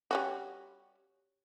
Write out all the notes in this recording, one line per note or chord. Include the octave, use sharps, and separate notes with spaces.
G3 C#4 F#4